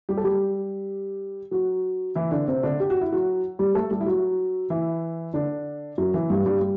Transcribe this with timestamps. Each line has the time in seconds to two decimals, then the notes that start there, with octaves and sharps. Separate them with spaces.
0.09 G3 G4
0.17 A4
0.24 G3 G4
1.51 F#3 F#4
2.15 E3 E4
2.31 D3 D4
2.48 C3 C4
2.63 D3 D4
2.80 G4
2.90 F#4
3.01 E4
3.12 F#3 F#4
3.59 G3 G4
3.75 A3 A4
3.91 G3 G4
4.01 E4
4.06 F#3 F#4
4.70 E3 E4
5.34 D3 D4
5.98 F#2 F#3
6.14 E3
6.30 G2 G3
6.46 G2 G3
6.61 G3